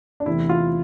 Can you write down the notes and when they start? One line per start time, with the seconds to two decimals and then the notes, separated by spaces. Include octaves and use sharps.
0.20 D4
0.26 E2 C3 E3 A3 C4 E4
0.49 F4